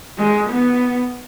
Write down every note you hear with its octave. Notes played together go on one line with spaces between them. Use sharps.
G#3
B3